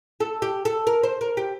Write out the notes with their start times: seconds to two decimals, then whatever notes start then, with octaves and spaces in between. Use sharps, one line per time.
0.20 A4
0.42 G4
0.65 A4
0.87 A#4
1.03 C5
1.21 A#4
1.37 G4